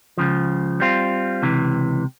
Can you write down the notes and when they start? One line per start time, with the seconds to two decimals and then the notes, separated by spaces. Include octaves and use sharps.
0.18 C#2 C#3 F3
0.80 G3 C4 F4
1.42 C#2 C3 E3